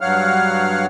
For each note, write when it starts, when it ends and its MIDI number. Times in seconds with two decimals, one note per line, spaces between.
0.01 0.86 43
0.01 0.86 54
0.01 0.86 73
0.01 0.86 77
0.01 0.86 78
0.01 0.86 89